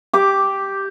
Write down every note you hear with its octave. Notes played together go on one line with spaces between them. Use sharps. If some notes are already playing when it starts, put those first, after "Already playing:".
G4 D6